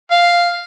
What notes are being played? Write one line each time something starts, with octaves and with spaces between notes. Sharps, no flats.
F5